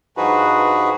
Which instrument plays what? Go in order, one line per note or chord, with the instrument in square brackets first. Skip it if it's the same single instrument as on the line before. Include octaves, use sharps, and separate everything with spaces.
[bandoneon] G2 F3 D#4 F#4 G#4 B4